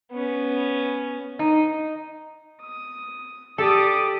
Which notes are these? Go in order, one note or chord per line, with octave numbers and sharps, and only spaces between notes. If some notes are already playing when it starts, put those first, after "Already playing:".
B3 C#4
D#4
D#6
G4 A4 D5 D#6